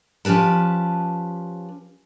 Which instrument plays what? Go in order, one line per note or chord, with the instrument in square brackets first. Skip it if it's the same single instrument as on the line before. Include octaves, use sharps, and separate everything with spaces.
[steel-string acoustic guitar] F3 C#4 G4 B4 A5